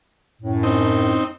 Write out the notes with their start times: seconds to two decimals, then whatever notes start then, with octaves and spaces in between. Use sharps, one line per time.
0.42 F#2 A2
0.63 C4 D#4